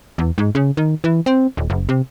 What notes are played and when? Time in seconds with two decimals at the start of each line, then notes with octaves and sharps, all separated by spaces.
0.18 E2
0.38 G#2
0.55 C#3
0.77 D#3
1.04 E3
1.26 C4
1.57 D#1
1.70 F#1
1.89 C3